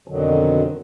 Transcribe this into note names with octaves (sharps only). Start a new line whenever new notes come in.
F2 B2 D3 D#3 F#3